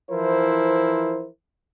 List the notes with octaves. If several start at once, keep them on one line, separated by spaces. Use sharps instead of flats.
E3 F3 E4 A#4 C5